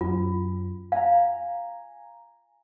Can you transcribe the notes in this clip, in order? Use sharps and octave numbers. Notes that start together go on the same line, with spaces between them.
F#2 F4
F5 G#5 A#5